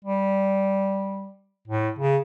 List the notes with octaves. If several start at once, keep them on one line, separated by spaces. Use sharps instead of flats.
G3
A2
C#3